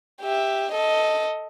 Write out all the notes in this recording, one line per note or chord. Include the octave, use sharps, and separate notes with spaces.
G4 E5
A4 D#5